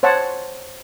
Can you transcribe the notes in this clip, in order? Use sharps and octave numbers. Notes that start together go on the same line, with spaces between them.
C5 C#5 F#5 A5